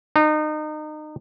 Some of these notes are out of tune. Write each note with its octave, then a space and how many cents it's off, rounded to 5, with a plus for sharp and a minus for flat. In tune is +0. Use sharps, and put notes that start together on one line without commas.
D#4 -30